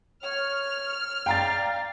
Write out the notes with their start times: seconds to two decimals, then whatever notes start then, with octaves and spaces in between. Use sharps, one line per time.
0.22 C#5 F6
1.26 D5 F5 G5 A#5 A6